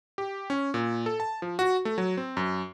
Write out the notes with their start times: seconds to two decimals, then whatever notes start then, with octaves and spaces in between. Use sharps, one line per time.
0.18 G4
0.50 C#4
0.74 A#2
1.06 A4
1.20 A5
1.42 F3
1.59 F#4
1.85 A3
1.98 F#3
2.17 C4
2.37 F#2